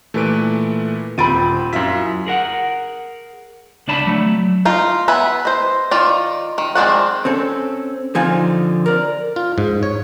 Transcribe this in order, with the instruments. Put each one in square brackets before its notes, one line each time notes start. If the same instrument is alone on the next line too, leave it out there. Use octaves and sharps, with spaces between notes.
[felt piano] A#2 E3 [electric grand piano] A3 B4 D7
[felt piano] D#1 A6 D7 [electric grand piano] C4 D#7 [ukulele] F4 B5
[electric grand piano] F#2 B6 [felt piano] E4 F4 E5
[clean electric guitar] G#4 A#4 F#5
C#2 D4 D5 A5 B5
F#3 A3
[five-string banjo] D#4 F4
B3 E5 G#5 B5
C5 D#5
D#3 F4 D5
D#3
D#3 G#3 C4 D5 F#5
[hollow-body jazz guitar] C4 C#4 A4
D3 F3 C4 D#4 F4 G#5
A#4 D5
[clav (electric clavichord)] F4
G#2
C#5